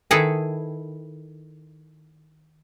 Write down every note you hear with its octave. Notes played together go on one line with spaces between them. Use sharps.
D#3 E4 G#4 A4 B4